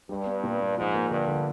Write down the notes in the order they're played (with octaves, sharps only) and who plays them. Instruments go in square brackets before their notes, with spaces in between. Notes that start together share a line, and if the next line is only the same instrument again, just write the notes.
[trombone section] G2 [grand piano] G3
[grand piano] B3
A#2
A#2
[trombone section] G#2 [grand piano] F3
[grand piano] A#3
[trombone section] G2 [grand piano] D3
[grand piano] D3